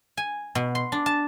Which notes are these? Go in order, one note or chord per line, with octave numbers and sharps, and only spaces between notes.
G#5
B2
C6
D4
A5